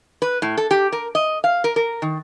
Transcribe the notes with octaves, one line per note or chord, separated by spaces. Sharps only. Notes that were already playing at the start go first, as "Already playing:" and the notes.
B4
A2
A4
G4
A#4
D#5
F5
A#4
A#4
D#3